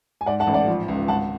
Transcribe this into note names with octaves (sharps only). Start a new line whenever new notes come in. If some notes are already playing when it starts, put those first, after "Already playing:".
G#5
G#2 D5 F#5
F#5 A5
A1
D5 F#5
F3
C#2
G#1 F#5 A5